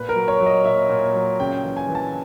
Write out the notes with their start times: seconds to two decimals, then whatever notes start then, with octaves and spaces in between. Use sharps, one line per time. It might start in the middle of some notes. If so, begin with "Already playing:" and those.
Already playing: A#2 B4
0.09 A#4
0.15 F#3
0.28 C#5
0.40 F#3
0.46 D#5
0.64 A#2 E5
0.89 A#2
1.14 F#3
1.40 C#3 G5
1.64 E3
1.77 G#5
1.89 E3
1.95 A5